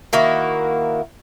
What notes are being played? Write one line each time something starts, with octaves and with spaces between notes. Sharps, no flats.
D#3 A#3 E4 F#4